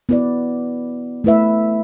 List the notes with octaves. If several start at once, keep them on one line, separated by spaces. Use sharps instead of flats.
B3 E4 B4 D5
A3 E4 B4 E5